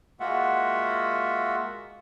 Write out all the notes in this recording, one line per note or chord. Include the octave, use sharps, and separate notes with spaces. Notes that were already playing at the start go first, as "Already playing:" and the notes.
G#3 A#3 F4 F#4 E5 F#5